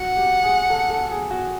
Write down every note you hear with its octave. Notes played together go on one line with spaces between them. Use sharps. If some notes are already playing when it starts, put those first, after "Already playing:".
Already playing: F#4 F#5
G4
G#4
A4
A4
G#4
F#4